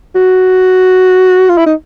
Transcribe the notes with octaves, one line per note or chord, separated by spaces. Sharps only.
F#4
F4
E4
D#4